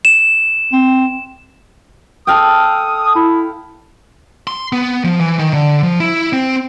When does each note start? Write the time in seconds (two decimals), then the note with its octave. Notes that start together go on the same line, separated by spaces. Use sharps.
0.05 E7
0.73 C4
2.27 A4 F5 G5 D#6
3.16 E4
4.47 C6
4.73 B3
5.04 F3
5.20 E3
5.39 D#3
5.54 D3
5.83 F3
6.00 E4
6.33 C4